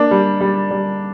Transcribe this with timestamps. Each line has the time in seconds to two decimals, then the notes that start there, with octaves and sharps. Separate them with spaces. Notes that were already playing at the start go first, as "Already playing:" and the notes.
Already playing: A#3 D4
0.11 G3
0.41 G3
0.71 G3